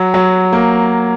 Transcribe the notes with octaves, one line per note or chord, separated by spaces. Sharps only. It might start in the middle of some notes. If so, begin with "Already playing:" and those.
Already playing: F#3
F#3
A#3